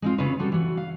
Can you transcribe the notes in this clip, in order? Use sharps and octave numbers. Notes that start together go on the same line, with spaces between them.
G#3 C4 F4
C#3 A3 F4 G#4 B4 C#5
G3 F#4 A4
E3 F#4
F5